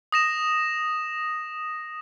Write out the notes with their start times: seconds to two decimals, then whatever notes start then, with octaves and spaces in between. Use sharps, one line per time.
0.12 D#6 A#6 E7